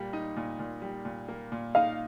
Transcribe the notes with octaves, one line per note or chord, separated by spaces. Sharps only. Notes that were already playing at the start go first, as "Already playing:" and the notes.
Already playing: A#2 G3 A#3
D#4
A#2
A#2
G3
A#2
A#3
A#2
D#4 F5